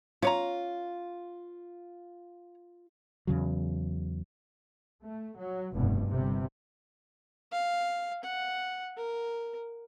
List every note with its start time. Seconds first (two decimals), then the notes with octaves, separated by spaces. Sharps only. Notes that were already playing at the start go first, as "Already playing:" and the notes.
0.22 C#4 F4 C#5 A#5
3.27 E2 C#3 F#3
5.03 A3
5.39 F#3
5.74 F1 G2 B2
6.09 G1 G2 C3 G3
7.52 F5
8.23 F#5
8.97 A#4